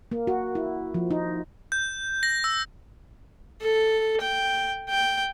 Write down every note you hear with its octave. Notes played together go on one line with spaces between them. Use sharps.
A#3
F#4
E4
F3
D#4
G6
A#6
E6
A4
G5
G5